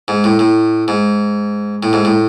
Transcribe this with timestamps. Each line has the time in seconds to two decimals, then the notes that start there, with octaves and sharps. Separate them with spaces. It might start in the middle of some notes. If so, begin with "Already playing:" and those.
0.08 G#2
0.24 A2
0.39 A2
0.88 G#2
1.83 A2
1.93 G#2
2.05 A2